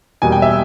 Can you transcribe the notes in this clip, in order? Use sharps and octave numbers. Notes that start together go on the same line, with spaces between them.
E2 B2 G3 A#3 G#5
G5
E5